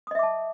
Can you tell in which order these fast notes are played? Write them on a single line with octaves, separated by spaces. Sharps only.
D#6 D#5 E5 D6 A5